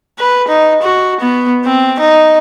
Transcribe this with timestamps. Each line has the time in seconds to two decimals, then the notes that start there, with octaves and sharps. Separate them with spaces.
0.19 B4
0.48 D#4
0.82 F#4
1.21 B3
1.64 C4
2.00 D#4